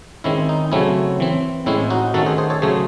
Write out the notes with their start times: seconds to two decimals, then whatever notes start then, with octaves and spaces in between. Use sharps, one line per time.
0.24 D#3 G#3 C4 C#4 E4
0.49 D#4
0.72 C#3 F#3 A3 C4 C#4 E4
1.20 E3 C4
1.66 A2 G#3 C4 C#4 E4
1.90 D#4 F#4
2.14 D#3 A3 C#4 F#4 A4
2.26 G#4 C5
2.38 G#4 C5
2.50 A4 C#5
2.62 C#3 F#3 A3 C#4 G#4 C5